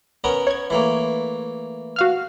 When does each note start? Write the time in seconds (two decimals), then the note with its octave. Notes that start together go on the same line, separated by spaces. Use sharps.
0.24 B3 C#4 A#4
0.47 C#5 G#6
0.70 E3 A3 A#3
1.96 F#4 F5 F6